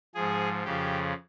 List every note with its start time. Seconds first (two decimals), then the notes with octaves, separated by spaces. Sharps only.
0.15 G#2 F3 G#4
0.63 F2 C#3 F3 G4